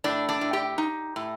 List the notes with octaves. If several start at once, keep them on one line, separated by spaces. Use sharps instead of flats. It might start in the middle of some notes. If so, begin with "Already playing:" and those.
A2 D4 D5
D4 D5
A2
G4 G5
D#4
A2